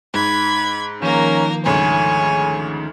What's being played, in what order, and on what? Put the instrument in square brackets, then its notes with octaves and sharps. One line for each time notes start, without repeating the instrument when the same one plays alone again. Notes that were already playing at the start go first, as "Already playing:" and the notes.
[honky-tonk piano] G#2 [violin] B5 G#6
[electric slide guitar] D#3 F3 [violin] A#3 A#4 [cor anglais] C#4
[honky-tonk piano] D2 G#2 C#3 [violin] C#5 [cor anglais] G#5